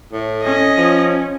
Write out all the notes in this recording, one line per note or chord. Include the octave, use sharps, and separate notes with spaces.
A2
C#4 D#5
F3